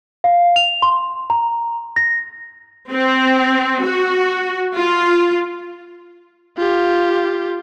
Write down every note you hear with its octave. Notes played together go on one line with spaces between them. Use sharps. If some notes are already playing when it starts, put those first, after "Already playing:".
F5
F7
C6
A#5
A#6
C4
F#4
F4
F4 G4